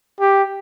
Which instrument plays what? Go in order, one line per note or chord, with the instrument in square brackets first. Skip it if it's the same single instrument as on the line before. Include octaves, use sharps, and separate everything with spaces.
[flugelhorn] G4